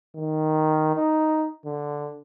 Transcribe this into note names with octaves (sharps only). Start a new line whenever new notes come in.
D#3
D#4
D3